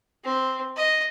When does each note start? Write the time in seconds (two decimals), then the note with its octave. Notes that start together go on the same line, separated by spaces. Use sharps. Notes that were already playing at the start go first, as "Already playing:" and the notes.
0.24 C4
0.76 D#5